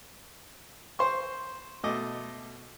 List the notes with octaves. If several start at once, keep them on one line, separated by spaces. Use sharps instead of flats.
C5 C6 C#6
B2 A3 D#5 D6